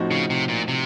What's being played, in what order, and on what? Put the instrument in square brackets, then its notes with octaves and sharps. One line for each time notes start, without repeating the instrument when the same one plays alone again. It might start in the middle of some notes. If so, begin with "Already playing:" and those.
Already playing: [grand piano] A2 F3 C4 D#4 F#4
[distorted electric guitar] C#3
C3
A#2
C3